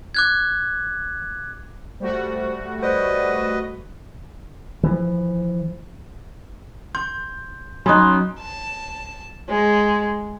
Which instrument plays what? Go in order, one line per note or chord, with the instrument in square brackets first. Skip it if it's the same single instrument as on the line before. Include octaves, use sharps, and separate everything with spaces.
[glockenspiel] D6 F#6 G#6
[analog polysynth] G3 A3 F#4 [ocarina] C5
[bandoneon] B4 D#5 [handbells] C5 [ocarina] D5
[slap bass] E3 F3
[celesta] C6 [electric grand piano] G6
[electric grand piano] F#3 [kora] C#4 D#4 [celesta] B5 D#6 F#6 [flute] C6
[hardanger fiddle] A5
G#3